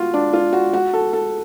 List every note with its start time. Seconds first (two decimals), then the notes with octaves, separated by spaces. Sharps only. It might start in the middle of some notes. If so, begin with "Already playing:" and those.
Already playing: F4 F#4
0.14 D4
0.33 F4
0.53 F#4
0.73 F#4
0.93 A4
1.13 A4